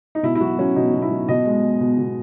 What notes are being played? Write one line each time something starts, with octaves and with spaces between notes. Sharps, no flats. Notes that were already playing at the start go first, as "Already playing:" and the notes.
D#4
B2 E4
E4
F#3 F#4
F#3 C#4
B2 D#4
B2
E4
F#3
B2 D#5
G#3
G#3
B2
B2